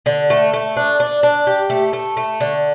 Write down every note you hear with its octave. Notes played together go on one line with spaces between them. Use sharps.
D3
A3
A3
D4
D4
D4
G4
A3
A3
A3
D3